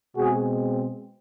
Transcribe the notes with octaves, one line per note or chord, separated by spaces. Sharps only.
B2 G#3 C4 F#4 G#4